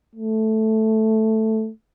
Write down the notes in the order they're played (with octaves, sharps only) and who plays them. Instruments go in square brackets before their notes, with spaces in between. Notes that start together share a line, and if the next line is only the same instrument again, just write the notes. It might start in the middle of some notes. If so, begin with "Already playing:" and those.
[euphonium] A3